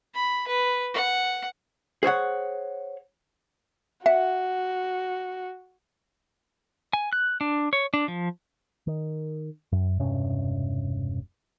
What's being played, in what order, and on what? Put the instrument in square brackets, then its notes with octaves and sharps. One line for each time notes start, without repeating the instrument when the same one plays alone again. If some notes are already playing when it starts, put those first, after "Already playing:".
[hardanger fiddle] B5
B4
F#5
[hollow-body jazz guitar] G#4 C5 C#5 F#5
[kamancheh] F#4 [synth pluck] E5 [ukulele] F#5
[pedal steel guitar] G#5
F#6
D4
C#5
D4
F3
[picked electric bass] D#3
F#2
E1 G2 C3 C#4